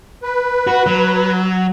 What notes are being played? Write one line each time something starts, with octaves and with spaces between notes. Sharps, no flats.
B4
F#4
F#3